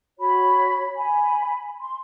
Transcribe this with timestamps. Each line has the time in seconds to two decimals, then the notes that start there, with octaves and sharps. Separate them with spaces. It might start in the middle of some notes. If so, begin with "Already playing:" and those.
0.19 F#4 C#5 B5
0.97 G#5 B5
1.80 C6